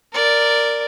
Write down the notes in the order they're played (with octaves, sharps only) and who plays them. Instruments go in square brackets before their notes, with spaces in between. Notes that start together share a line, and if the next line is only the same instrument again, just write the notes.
[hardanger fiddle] A#4 D5